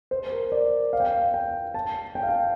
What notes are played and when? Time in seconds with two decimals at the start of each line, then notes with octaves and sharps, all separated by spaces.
0.11 C5
0.32 A#4
0.52 D5
0.93 F5
1.00 G5
1.07 F5
1.34 G5
1.74 A5
2.15 G5
2.23 F5
2.29 G5